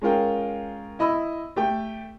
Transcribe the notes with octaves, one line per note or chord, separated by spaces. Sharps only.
G#3 C#4 F4 A#4 G5
E4 D#5 B5 E6
A3 G4 G5